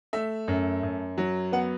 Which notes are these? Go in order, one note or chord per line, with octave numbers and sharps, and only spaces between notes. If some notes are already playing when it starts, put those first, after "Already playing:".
A3 E5
F#2
F#2
F#3
B3 F#5